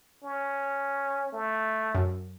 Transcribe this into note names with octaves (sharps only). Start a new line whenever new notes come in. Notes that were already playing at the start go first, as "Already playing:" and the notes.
C#4
A3
F#2